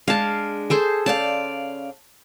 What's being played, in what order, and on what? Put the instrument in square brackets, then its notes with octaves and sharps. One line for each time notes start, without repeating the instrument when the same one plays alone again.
[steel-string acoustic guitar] G#3 D4 [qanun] F5 A5
[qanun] G#4 A4 C5
[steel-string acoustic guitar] C#3 D5 F5 [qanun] A5